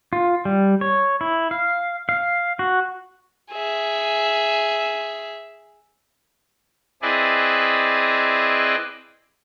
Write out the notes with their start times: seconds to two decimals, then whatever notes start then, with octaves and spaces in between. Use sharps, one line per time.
0.13 F4
0.45 G3
0.81 C#5
1.21 E4
1.51 F5
2.09 F5
2.59 F#4
3.52 G#4 E5
7.02 C4 E4 G#4 B4 D5 D#5